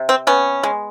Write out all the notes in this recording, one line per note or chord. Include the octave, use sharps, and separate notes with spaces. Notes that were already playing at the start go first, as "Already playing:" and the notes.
Already playing: C3
C4
B3 C#4
G#3